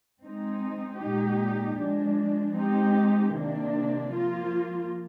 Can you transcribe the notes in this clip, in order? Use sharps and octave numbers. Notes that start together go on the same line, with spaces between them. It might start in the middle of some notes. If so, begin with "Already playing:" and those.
G#3 C4 D#4
A#2 G#3 D#4 G4
F3 G#3 D4
G#3 C4 D#4 G4
C3 D#3 A#3 D4
F3 A#3 F4